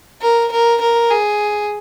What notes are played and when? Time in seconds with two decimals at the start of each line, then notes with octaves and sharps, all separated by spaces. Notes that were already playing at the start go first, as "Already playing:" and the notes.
0.22 A#4
0.52 A#4
0.81 A#4
1.11 G#4